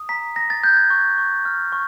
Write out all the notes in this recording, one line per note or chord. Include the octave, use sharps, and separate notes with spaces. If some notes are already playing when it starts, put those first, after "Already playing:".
Already playing: D#6
A#5 B6
A#5 A#6
A6
F#6 G6
G#6
C#6 G#6
C#6
F6
C#6